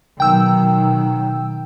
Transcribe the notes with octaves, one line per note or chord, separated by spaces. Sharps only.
B2 D#3 F#3 G5 E6